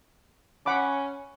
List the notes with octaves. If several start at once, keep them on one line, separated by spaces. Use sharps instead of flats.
C#4 F#5 B5 D6